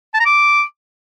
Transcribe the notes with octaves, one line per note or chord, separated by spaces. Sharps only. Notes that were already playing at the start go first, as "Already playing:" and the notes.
A5
A#5
D6